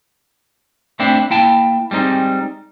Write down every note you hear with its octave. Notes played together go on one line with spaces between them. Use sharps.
A3 C4 D4 E4 C5
A#3 E4 G5 A5
G3 G#3 C4 D#4